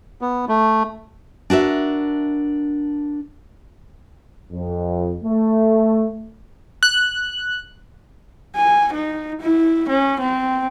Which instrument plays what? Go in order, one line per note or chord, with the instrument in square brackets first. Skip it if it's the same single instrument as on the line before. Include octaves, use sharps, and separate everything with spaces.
[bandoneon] B3
A3
[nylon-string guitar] D4 F#4 A#4 E5
[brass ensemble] F2
A3
[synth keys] F#6
[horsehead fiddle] G#5
D#4
E4
C#4
C4